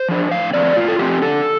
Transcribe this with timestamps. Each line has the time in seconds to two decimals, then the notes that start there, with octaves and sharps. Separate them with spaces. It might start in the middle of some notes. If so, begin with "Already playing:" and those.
Already playing: C5
0.09 F3 D4
0.32 A2 F5
0.54 F3 A3 C4 D5
0.76 A2 F4
0.88 A4
0.99 F3 A3 C4 G4
1.22 D3 A4